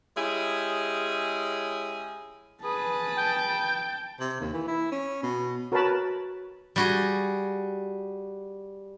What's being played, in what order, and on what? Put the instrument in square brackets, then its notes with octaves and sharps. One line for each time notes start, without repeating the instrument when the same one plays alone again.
[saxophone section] G#3 C#4 E4 G4 G#4
[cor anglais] G#4 [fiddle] B4 [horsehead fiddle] A5
[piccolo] G5
[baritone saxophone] C3
D#2
E3
E4
C#4
B2
[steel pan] F#4 A#4 B4 C#5 A5 B5
[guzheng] G3 F#4 G#4